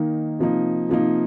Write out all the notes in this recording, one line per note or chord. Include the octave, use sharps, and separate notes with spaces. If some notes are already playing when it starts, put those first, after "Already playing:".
Already playing: D#3 A#3 D#4
C3 F3 A#3 D#4
C3 F3 A#3 D#4